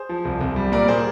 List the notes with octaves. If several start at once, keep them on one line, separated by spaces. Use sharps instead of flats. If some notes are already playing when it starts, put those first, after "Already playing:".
Already playing: G#4 C5
F3
C2
C2
G3
A#2 A#4 D5
G#4 C5